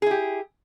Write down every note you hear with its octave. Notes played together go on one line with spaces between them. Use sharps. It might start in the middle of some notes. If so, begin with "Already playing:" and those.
E4 G4 G#4